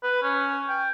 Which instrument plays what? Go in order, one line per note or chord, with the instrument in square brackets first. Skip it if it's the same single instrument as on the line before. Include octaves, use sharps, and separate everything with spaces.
[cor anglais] B4
C#4
G5